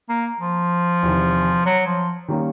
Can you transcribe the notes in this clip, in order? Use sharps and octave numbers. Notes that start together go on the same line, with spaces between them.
A#3
F3
E2 C3 D#3
F#3
F3
D#3 G3 A#3 C#4